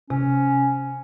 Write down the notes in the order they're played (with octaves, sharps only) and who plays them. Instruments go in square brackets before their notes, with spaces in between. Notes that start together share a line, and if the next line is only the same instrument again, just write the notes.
[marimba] C3 [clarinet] C#4